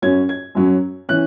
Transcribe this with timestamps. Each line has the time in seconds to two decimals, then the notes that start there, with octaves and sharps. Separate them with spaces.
0.02 F#2 F#3 C#4 G#6
0.29 G#6
0.55 F#2 F#3 C#4
1.09 E3 C#4 F#6